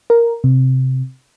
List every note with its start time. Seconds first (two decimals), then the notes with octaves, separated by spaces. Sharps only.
0.10 A#4
0.44 C3